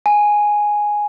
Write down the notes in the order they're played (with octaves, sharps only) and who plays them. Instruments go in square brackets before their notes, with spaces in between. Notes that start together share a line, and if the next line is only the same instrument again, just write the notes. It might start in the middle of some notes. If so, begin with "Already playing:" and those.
[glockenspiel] G#5